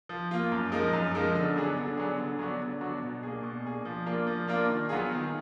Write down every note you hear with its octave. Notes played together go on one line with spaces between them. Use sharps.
F3
A#3 F4
F#2
F3 G#3 D#4 A#4
F#2
F3 G#3 D#4 A#4
D3
F#3 B3 D4 G#4
D3
F#3 B3 D4 G#4
D3
F#3 B3 D4 F#4
D3
F#3 B3 D4 F#4
B2
A#3 D4 G#4
B2
A#3 D4 G#4
F3
A#3 D4 F4 A#4
F3
A#3 D4 F4 A#4
D#3
F#3 B3 F4 G#4
D#3